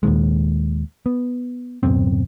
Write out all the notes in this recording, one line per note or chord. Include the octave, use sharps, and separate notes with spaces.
D#2 A#2 D#3 G#3
B3
D1 F#2 B2 C4